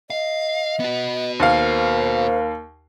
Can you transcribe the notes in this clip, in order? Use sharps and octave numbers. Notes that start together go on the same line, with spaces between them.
D#5 F5
B3 F#4
D#2 A#3 C5 F5